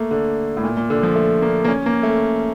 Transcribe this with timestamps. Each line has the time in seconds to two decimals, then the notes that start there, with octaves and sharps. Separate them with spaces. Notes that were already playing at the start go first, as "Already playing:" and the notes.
Already playing: A3 A#3
0.11 D3
0.57 A2
0.64 A#2
0.77 A#2
0.90 D3
1.03 F3
1.15 A3
1.42 A#3
1.64 A#3
1.68 C#4
1.86 A#3
2.03 A3